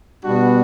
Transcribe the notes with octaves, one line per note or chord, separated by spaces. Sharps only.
B2 G3 B3 D4 F#4